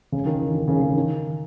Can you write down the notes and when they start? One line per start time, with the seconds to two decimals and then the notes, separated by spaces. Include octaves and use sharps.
0.12 C#3
0.26 D#3
0.39 E3
0.53 D#3
0.68 C#3
0.82 C#3
0.96 D#3